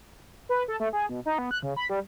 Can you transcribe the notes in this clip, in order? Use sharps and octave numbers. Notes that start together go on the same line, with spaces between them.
B4
A4
A3
G#4
B2
D#4
B3
F#6
C#3
B5
G3